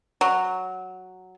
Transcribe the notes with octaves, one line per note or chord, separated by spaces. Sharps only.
F#3